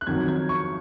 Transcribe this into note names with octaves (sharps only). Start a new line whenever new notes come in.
F#6
F2 D#3 F#3 G#6
G#6
C#6